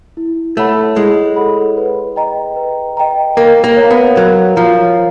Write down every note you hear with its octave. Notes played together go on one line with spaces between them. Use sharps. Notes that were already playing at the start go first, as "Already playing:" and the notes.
E4
A3 A4 C#5 F#5 B5
G#3 E4
A4 C#5 F#5 B5
B4
D#5 G5 A#5
B4
D#5 G5 A#5
A#3 A#4
A#3
C#5 F5 A#5
B3
F#3 A#4
F3 C#5 F5 A#5